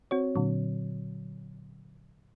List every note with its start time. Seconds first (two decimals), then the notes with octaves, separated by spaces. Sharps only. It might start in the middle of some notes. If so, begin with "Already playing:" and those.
0.11 C4 F#4 C#5
0.36 A#2 D3 F#3